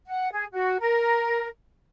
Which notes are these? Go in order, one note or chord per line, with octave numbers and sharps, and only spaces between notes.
F#5
G#4
F#4
A#4